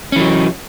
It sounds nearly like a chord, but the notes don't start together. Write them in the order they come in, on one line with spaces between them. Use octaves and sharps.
C#4 E3 F#3